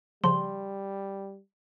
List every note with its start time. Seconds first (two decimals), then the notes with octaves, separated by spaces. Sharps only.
0.24 C#3 F3 G3 C6